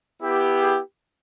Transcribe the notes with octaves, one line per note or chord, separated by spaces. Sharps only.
B3 E4 G4
G#4